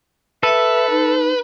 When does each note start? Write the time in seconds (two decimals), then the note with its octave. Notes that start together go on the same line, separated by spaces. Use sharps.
0.43 A4 B4 E5
0.90 D#4